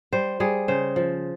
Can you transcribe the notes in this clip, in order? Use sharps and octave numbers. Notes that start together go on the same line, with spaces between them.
G3 C5
G3 G#4
C#3 C5
F3